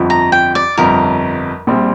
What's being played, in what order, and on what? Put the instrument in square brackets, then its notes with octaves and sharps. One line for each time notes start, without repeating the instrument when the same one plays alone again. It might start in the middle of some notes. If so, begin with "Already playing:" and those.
Already playing: [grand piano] G1 F2 F3
[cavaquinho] A#5
G5
D5
[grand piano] G1 F2 F3 [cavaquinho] A#4
[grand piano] A#1 A#2 G3 C4